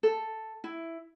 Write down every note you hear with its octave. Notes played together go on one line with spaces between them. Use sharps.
A4
E4